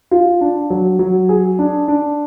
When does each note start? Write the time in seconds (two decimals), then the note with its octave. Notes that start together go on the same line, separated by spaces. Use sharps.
0.11 F4
0.41 D4
0.70 F#3
0.99 F#3
1.29 G#4
1.59 D4
1.88 D4